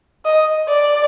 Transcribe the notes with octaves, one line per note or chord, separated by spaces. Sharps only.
D#5
D5